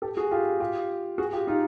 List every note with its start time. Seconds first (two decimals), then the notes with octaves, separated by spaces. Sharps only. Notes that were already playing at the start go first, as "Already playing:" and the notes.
0.02 G4 A4
0.17 F#4 G#4
0.31 F4 G4
0.60 F4 G4
1.18 F#4 G#4
1.33 F4 G4
1.47 D#4 F4